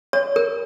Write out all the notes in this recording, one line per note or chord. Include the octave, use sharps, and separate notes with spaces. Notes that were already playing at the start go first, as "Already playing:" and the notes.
C#5
A#4